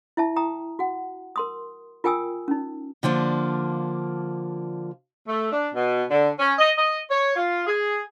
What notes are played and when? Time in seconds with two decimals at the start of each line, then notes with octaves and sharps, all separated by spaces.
0.17 E4 E5 A5
0.36 G5 A#5 D#6
0.79 F#4 F#5
1.36 A#4 C6 D#6
2.04 F4 A#4 G5 G#5 D#6 E6
2.48 C#4 D#4
3.03 D3 F3 A#3 D4
5.28 A3
5.52 D4
5.74 B2
6.11 D3
6.39 C#4
6.59 D#5
6.78 D#5
7.10 C#5
7.36 F4
7.67 G#4